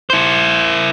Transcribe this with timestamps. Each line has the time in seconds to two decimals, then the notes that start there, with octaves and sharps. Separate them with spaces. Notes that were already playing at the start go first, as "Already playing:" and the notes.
0.10 E4 C5